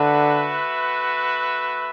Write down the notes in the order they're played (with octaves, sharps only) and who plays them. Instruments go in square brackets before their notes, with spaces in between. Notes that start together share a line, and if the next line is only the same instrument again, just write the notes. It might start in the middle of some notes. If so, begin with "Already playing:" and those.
Already playing: [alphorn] D3 [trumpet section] A3 F#4 B4 E5